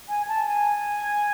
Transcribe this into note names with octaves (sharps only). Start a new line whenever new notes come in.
G#5
A5
G#5